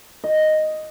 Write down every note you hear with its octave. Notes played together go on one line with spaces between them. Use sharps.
D#5